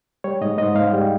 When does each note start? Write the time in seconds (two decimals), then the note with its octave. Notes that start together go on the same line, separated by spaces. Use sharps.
0.24 G3 C#5
0.41 G#2 D#5
0.58 G#2 D#5
0.75 G#2 F5
0.93 G3